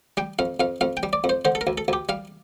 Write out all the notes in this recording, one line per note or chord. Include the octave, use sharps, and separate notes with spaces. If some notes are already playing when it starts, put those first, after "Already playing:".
G3 G5
F2 F5
F2 F5
F2 F5
G5
G3
D5
F2
C5
D3 C5
A4
A#4
D2
A4
D2 G4
G3 F5